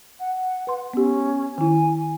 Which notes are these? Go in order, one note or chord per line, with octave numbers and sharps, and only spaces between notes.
F#5
B4 C6
B3 C#4 G4
D#3 E4 G#5